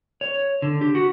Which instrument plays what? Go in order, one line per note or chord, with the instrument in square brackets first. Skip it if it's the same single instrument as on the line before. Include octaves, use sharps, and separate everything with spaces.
[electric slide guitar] C#5
D3
G4
F#4